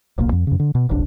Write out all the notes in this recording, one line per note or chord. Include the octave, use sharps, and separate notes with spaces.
D1 B1 A#3
F2
F#2 C#3
D3
B2
D1 G1 C2 D4